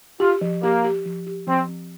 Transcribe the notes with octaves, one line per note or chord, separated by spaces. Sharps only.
F4 G4
F3
A#3 G4
G4
F3
G4
F3 C4
C4